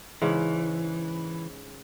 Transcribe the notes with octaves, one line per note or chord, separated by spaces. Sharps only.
G#2 C#3 E3